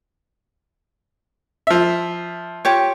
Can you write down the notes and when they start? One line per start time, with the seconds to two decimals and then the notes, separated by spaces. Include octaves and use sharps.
1.67 F3 E5
2.65 F4 G4 C#5